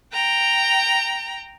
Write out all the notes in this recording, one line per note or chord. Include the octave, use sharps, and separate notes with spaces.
G5 A#5